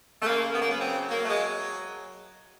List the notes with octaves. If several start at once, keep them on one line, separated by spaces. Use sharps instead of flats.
A3
C#3 A#3
B3
A#3
F#3 B3
C4
F#3 A#3
A3
G#3